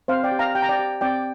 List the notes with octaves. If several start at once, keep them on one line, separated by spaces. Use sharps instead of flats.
C4 C5 F5
D5 G5
G4
F5 A#5
G4 G5
A#5
D5 G5
G4
C4 D5 G5